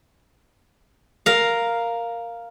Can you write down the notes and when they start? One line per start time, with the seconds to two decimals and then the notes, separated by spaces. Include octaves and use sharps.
1.26 A#4 F5